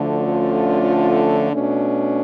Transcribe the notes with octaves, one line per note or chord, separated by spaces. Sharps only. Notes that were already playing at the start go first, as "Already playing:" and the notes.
Already playing: D2 D3 F3 A3
C#4 F4
B2 A3 C#4 D4